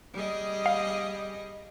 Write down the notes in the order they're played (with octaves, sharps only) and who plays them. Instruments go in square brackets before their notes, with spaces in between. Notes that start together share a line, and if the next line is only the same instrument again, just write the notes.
[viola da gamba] G3 G#4 D#5
[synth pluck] F5